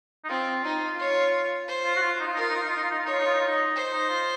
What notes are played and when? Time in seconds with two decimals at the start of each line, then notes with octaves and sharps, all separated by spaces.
0.25 D#4
0.29 C4 F4
0.64 D#4
0.98 C#5
1.68 C5
1.85 F4
1.96 F#4
2.02 F4
2.19 D#4
2.26 F4
2.33 D#4
2.37 F4 A#4
2.49 D#4
2.56 F4
2.62 D#4
2.69 F4
2.77 D#4
2.84 F4
2.91 D#4
2.99 F4
3.06 D#4 C#5
3.13 F4
3.20 D#4
3.26 F4
3.34 D#4
3.41 F4
3.48 D#4
3.75 C5
3.93 D#4
4.10 F4